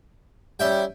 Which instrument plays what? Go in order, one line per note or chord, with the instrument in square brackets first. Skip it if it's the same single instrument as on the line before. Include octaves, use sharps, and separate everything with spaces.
[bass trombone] G3 [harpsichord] C#4 E5 G5